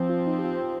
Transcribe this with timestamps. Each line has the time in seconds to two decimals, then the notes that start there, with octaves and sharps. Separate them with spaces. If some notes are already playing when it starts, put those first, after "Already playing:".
Already playing: F3 C4
0.10 F4
0.27 D#4
0.39 G4
0.44 F4